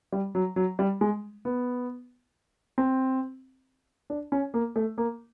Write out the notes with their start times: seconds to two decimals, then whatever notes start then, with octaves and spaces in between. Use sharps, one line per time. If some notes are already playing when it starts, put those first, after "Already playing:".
0.12 G3
0.35 F#3
0.56 F#3
0.79 G3
1.01 G#3
1.45 B3
2.78 C4
4.10 D4
4.32 C#4
4.54 A#3
4.76 A3
4.98 A#3